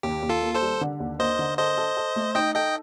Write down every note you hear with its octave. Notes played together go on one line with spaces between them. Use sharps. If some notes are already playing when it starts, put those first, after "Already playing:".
D#2 G4
D#2
F4 A4
A#3
A4 C5
G3
D3
D#2
A#3 C5 D#5
D3
A4 C5 D#5
A4
A4
A3
D#4 D#5 G5
A4 D#5 G5